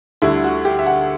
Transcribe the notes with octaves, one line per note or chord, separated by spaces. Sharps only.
D2 D3 G3 E4
F#4
G4
E5
F#5